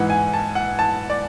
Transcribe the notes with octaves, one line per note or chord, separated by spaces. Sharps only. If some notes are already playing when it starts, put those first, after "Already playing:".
Already playing: G#2 E3 F#5
G#5
A5
F#5
A5
D5